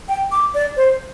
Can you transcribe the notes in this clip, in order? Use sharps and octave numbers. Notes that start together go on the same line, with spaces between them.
G5
D6
D5
C5